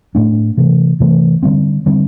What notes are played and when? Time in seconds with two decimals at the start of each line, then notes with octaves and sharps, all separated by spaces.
0.15 A2 A3 D4
0.57 C3 E3 A3
1.00 C3 E3 A3
1.43 D3 G3 C4
1.86 D3 G3 C4